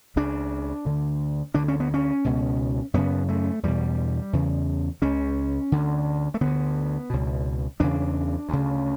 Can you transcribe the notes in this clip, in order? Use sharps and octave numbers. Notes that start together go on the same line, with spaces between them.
C#2 C#3 D4
D2 D3
D2 D3 D4
C#4
B3
C#4
C#2 B2
F#2 C#3 B3
A3
E2 B2 G3
E2 C#3
C#2 C#3 C#4
D2 D3
A3
D2 D3 B3
C#2 B2
E2 C#3 D4
D2 C#3